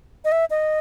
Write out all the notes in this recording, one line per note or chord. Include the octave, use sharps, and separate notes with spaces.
D#5
E5
D#5